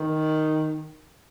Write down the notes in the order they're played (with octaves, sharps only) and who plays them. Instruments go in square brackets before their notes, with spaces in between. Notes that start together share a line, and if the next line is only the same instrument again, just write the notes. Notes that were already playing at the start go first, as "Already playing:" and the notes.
Already playing: [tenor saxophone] D#3